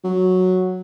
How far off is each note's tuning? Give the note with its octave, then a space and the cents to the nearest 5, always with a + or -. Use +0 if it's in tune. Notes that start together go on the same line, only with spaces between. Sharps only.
F#3 -5